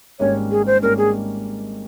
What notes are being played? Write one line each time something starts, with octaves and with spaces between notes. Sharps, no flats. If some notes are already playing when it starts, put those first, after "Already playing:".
G#1 G#2 G3 A#3 C#4 C#5
G#4
C5
G#1 G#2 G3 A#3 C#4 A#4
G#4